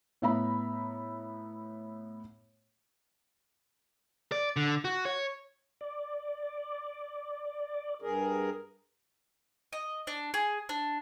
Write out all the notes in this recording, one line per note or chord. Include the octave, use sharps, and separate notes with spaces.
A2 B3 E5 A#5 B5
D5
D3
F#4
C#5
D5
G2 G#4 A#4
D#5
D4
G#4
D4